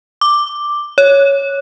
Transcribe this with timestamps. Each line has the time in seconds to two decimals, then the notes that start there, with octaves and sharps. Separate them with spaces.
0.21 D6
0.98 C#5